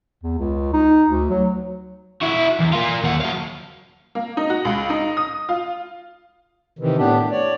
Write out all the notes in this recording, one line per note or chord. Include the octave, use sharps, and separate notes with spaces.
E2
C#2
D#4
D2
F#3
E4 F#4
E2
A#3 F4
D#2 F#5
F#3 F5
A#3
D#4
F#4
C#2
D#4
D#6
F4
C3 D#3 E3
A2 B3 D4 G4
C#5 D5